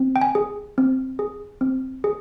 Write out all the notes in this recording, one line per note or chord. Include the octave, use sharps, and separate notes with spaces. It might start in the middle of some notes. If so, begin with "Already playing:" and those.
Already playing: C4
G5
G#5
G#4
C4
G#4
C4
G#4